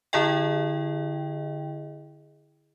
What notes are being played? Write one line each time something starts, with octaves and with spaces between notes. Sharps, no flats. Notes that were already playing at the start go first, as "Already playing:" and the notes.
D3 E4 G#4 D#5 G5